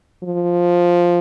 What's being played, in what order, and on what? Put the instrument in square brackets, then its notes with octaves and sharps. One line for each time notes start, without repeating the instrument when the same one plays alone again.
[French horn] F3